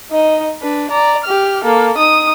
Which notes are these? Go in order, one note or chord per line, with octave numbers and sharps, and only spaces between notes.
D#4 D#5
D4 B4
D5 A#5
G4 F6
A#3 A4
D#4 D#6